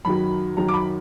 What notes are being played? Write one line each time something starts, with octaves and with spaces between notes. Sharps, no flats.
F#2 D#3 F#3 B5
F#2 D#3 F#3 A#5
D6
B5